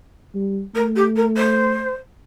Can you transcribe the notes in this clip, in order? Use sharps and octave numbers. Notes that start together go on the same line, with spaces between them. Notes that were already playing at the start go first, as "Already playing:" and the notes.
G3
A3 A#4
G4
A#4
C5